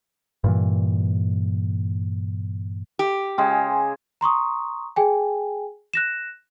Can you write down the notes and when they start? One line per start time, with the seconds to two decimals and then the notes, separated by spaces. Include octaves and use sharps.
0.44 G2 A#2 E3
2.99 G4
3.38 C#3 G#3 G5 C6
4.21 A#5 C6 C#6 D#6
4.96 G#4 G5 G#5
5.94 F#6 A#6 E7